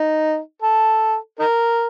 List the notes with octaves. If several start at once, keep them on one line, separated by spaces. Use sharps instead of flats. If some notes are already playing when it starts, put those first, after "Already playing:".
Already playing: D#4
A4
D#4 A#4